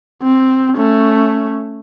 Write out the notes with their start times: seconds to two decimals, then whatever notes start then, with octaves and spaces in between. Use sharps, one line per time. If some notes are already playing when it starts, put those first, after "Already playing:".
0.23 C4
0.77 A3 C#4